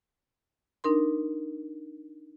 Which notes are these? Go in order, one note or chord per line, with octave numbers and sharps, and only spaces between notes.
D4 D#4 A#4 C6